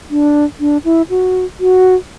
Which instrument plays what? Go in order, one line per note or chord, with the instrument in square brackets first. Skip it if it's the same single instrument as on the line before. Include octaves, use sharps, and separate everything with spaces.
[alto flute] D4
D4
E4
F#4
F#4